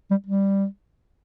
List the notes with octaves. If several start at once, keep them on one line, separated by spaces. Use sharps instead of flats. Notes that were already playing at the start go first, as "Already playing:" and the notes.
G3
G3